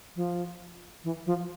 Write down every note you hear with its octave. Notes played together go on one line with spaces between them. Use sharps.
F3
E3
F3